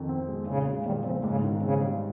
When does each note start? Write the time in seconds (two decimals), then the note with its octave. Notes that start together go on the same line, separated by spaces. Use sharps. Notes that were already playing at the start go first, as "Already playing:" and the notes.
Already playing: F2 D#3
0.09 C4
0.28 G#3
0.47 A#2 C#3
0.66 G#3
0.86 A#2 D#3 G3
1.05 C#3 F3 C4
1.24 G#2 C#3
1.44 D#3
1.62 C#3 C4
1.82 G3